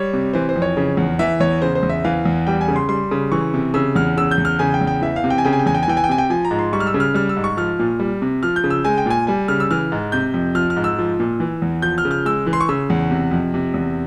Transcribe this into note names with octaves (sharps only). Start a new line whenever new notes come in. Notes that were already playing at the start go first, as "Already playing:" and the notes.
Already playing: G3 C#5
C3
E3 C5
C5
F2
C#5
C#3
E2
E3 E5
E2 C#5
C#3 C5
C5
E2
E5
E3 F5
E2
G3 G5
G#5
C#3
C6
G3 C6
C#3
E3 C#6
C3
C#3 E6
E2 F6
C#3 E6
G6
E2
F6
C#3 G#5
G5
E2
G5
E3 E5
F5
C3
G5
G#5
C#3 G5
G#5
G5
E2 G#5
G5
G#5
E3 G5
G#5
G5
C3 G#5
G5
F3 G#5
A#5
G#2
C6
G3 C#6
F6
E6
C#3
F6
G3 F6
E6
G#2
C#6
F3 F6
A#2
G3
C3
F3 F6
G6
C#3
E6
G#3 G#5
G5
A#2 G#5
G3 G#5
C#3 F6
E6
E3 F6
G#2
C3 G6
F2
F3 F6
F6
G#2
E6
F3
A#2
E3
E2
F3 G6
F6
C#3
F6
G#3 E6
E3
C6
C#6
C#3 E6
E2
C3
F2
C3
E2